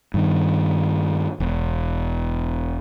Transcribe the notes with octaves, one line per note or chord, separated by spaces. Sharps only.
G2 D#3
E1